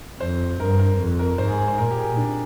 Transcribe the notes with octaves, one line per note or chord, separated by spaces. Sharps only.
F2 C5
G2 A#4
A#4
F2
A#4
G#2 C5
G#4
G#4
C5
A#2 A#4
G4
G#4
D4